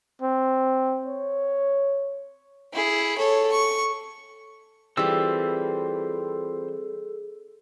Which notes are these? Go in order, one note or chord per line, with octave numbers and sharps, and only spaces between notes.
C4
C#5
E4 G#4
A4 C#5
C#6
E3 G3 C4 F4 G#4 A4 E6